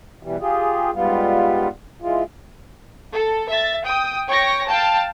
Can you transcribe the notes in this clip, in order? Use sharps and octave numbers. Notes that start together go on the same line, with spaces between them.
B2 E3 G3
F4 G4 G#4
G#2 G3 B3 F4
E3 G#3 F4
A4
E5 A6
G5 D#6
C#5 G5 C#6 A#6
F5 G5 A5